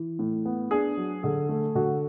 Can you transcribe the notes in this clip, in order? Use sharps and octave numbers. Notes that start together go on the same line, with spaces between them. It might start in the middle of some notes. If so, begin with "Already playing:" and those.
Already playing: E3
A2
B3
D4 G#4
F#3
D3 G#4
A3
D3 F#4